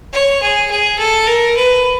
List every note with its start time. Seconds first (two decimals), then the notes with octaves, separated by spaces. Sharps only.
0.13 C#5
0.42 G#4
0.71 G#4
0.98 A4
1.27 A#4
1.56 B4